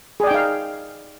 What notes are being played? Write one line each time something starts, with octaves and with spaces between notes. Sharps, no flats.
D#4 G#4 D5 F5 G5